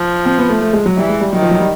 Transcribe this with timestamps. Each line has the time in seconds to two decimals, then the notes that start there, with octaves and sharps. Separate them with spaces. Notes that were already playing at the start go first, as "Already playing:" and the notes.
Already playing: F3
0.25 C4
0.38 B3
0.50 A3
0.61 A3
0.73 G#3
0.86 F#3
0.97 E3 G3
1.09 G#3
1.21 G3
1.33 D#3 F#3
1.42 F3
1.51 F#3
1.60 G3